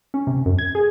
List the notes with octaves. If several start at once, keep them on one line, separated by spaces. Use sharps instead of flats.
C#4
C3
F#2
G#6
G#4